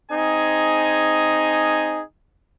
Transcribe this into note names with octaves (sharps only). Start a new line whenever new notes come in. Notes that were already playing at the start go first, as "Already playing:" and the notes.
C4 D#4 G#4 G#5